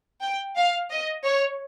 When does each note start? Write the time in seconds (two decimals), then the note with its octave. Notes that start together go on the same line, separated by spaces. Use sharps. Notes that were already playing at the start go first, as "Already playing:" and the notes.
0.22 G5
0.57 F5
0.91 D#5
1.25 C#5